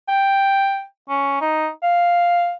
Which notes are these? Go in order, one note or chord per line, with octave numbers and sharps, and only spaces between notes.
G5
C#4
D#4
F5